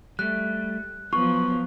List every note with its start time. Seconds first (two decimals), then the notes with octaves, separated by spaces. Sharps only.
0.19 G3 A3 F#6
1.13 F3 F#3 B3 F4 B4 C#6